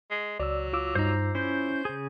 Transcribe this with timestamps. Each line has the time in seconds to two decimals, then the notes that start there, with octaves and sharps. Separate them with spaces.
0.11 G#3
0.40 C#2 F#3 D5 E6
0.73 F4 D6 E6
0.95 G2 D#4 C5 A#5
1.35 C#4 E4 C5 G6
1.85 C#3 G#4